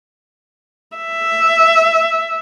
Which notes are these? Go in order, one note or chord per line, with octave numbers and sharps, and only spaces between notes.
E5